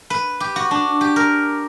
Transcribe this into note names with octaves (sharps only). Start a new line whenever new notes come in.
B4
G4
F#4
D4
G4
A#4